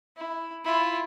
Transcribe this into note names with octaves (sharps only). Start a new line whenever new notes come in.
E4
E4 F4